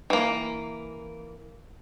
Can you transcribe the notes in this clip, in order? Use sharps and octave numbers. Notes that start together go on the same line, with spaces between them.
E3 A#3